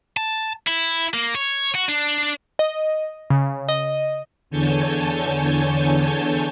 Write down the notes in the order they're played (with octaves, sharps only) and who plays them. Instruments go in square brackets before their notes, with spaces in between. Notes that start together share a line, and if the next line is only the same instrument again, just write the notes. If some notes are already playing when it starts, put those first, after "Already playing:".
[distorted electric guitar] A5
E4
A#3
C#5
F#4
D4
[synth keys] D#5
C#3
D#5
[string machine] E2 D3 C#5 G#5 A5 G6